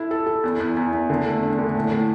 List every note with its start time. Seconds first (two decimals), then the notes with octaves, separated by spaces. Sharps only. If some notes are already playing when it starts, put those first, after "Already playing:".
Already playing: E4 A4
0.11 A4
0.27 A4
0.44 E2
0.60 E2
0.77 E2
0.92 E2
1.10 D3
1.26 A3
1.43 D4
1.59 D3
1.75 A2
1.91 A2